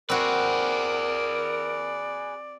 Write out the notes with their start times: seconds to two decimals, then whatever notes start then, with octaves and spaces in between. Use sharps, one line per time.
0.10 C4 F#4 G#4 A#4 B4 D5